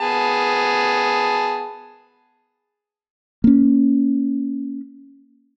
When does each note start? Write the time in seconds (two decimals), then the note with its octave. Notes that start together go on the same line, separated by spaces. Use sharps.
0.01 B3 G#4 A5
3.44 A#3 C#4